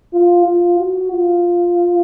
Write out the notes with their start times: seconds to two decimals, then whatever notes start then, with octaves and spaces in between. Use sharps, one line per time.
0.13 F4
0.46 F4
0.80 F#4
1.12 F4